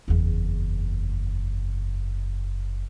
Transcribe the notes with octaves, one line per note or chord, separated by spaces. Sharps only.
F#1 E2